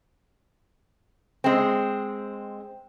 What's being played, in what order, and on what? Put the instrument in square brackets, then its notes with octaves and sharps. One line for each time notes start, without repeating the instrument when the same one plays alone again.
[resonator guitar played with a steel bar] G#3 C4